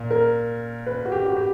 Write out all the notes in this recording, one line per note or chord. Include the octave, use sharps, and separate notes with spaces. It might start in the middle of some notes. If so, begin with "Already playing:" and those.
Already playing: A#2
A#4
B4
F#4
G4
F#4
G4